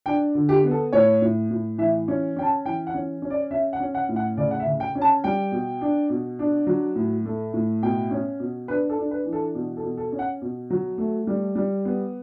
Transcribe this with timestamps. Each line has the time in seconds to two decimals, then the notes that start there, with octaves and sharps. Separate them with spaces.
0.06 D4 G5
0.35 D3
0.49 G4
0.64 B3
0.71 A4
0.93 A2 C#5
1.22 A2
1.51 A2
1.78 E3 E5
2.08 C#4
2.36 C#4 G5
2.43 A5
2.65 E3 G5
2.87 F#5
2.94 C#4
3.22 C#4
3.30 D5
3.51 C#4 E5
3.73 F#5
3.80 C#4
3.95 F#5
4.09 A2
4.16 F#5
4.37 C#3 D5
4.51 F#5
4.60 E5
4.66 C#3
4.80 G5
4.95 C#4
5.02 A5
5.24 G3 G5
5.52 B2
5.81 D4
6.10 B2
6.39 D4
6.67 F#3
6.96 A2
7.25 A3
7.54 A2
7.83 B2 G5
8.11 C#4
8.40 B2
8.68 D4 B4
8.90 A4
8.98 D4
9.11 B4
9.25 E3
9.33 A4
9.55 B2
9.77 A4
9.83 B2
9.97 A4
10.12 C#4
10.19 F#5
10.42 B2
10.70 F#3
10.98 A3
11.27 G3
11.55 G3
11.85 B3